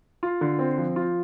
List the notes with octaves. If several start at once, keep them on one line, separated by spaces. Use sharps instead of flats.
F4
D3
C4
F3
F4